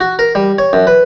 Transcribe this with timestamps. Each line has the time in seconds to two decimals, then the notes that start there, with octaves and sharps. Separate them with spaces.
0.01 F#4
0.19 A#4
0.35 G3
0.58 C#5
0.73 F#2
0.87 B4